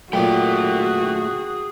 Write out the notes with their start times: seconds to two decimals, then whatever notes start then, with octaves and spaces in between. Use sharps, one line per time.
0.13 F#2 A#2 A3 F#4 G#4 G5